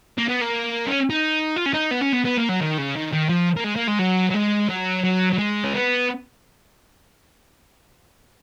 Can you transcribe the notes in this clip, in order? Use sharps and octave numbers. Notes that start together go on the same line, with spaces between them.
A#3
B3
A#3
C#4
D#4
F4
C#4
D#4
B3
C#4
B3
B3
A#3
F#3
D#3
C#3
D#3
D#3
F3
A#3
G#3
A#3
G#3
F#3
F#3
G#3
F#3
F#3
F#3
G#3
C#4
B3